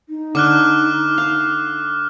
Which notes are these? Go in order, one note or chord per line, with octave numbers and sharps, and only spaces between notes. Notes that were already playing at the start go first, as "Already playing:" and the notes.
D#4
D3 D6 F6 F#6
F5